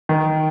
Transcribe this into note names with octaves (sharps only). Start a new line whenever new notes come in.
D#3